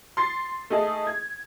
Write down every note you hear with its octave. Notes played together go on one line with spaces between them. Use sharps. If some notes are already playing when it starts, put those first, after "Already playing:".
C6 A6 C7
A3 D#4 G#4 A5
G#6